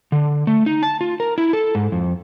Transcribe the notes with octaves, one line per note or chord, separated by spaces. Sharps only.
D3
A3
D#4
A5
F4
A#4
E4
A4
G#2
F2